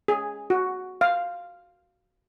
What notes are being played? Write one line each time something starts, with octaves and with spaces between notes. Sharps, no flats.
G#4
F#4
F5